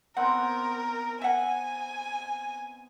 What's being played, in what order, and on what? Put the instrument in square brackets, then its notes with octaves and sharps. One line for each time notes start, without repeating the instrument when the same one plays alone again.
[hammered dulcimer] B3 C4 D#4 [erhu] A#4 [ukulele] F#5
[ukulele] E5 F#5 [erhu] G#5